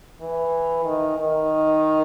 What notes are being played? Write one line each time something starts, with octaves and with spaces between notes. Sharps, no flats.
E3
D#3
D#3